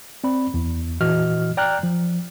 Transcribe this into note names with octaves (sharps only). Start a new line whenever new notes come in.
C4 D5 B5
E2
A#2 E3 F#4 D#5 F6
D5 G5 A#5 F6 F#6
F3